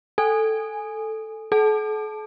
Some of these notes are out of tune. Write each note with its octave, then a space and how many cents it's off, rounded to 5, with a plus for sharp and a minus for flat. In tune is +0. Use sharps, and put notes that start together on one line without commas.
A4 +0 G#5 +0
A4 -45 A5 -15